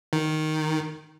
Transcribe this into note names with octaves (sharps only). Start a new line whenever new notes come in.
D#3